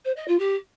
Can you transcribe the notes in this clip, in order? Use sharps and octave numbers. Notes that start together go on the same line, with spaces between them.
C5
D#5
F4
G4